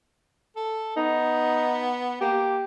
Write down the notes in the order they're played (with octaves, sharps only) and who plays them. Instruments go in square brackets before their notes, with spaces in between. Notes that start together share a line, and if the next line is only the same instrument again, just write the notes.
[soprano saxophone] A4
[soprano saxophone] B3 [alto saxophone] D#4
[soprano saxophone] A#3 [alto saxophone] G4